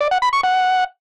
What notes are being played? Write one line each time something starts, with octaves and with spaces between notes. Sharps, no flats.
D5
F#5
B5
C#6
F#5